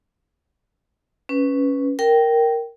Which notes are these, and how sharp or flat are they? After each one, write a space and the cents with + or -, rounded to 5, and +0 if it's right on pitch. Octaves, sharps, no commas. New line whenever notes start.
C#4 +0 B4 +0
A#4 +0 G5 -10